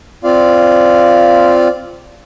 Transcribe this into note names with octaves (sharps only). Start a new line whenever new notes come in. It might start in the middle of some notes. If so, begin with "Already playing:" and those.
C4 F4 D5 F5